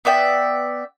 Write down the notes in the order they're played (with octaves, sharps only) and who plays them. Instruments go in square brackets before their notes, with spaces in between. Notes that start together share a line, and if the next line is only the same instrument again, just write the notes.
[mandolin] B3 D5 E5 G5